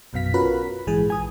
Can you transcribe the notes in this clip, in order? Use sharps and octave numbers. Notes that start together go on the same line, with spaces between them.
A#1 F#2 B2 F5 B6
C#4 F4 F#4 A#4 B4 B5
A#1 G#2 E3 G#4
G#5 D#6